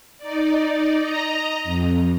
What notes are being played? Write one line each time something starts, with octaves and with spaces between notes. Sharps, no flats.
D#4 D5
D#5 A#5
F2